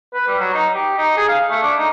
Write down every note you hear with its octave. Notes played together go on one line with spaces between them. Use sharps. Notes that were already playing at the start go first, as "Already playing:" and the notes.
B4
G3
F#3
D#4
G4
D#4
G#4
F5
A3
D4
D#4